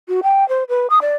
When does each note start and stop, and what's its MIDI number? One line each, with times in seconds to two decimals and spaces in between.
0.08 0.20 66
0.23 0.47 79
0.49 0.64 72
0.69 0.87 71
0.90 0.99 87
1.02 1.16 74